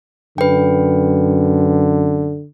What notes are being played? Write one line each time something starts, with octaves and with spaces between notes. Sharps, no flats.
F#2 D3 B4 G5